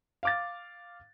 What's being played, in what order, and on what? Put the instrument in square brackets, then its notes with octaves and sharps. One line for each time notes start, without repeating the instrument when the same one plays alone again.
[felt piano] F5 D6 A6